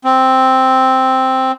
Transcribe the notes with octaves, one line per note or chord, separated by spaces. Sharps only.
C4